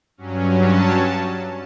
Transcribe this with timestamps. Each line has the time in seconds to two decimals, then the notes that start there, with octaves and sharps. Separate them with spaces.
0.17 G2 F#3 C#4
0.59 A5